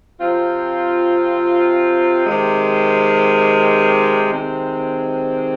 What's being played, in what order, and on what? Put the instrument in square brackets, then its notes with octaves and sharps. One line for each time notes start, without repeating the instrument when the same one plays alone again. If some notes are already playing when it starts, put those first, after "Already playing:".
[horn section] C3 F3 C4 F4
C3 D#3 G#3
C3 D#3 G#3 C4